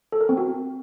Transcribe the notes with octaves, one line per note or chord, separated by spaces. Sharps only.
A4
A#4
C4
F#4